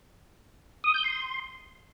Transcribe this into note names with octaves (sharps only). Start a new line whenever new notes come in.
D#6
G6
C6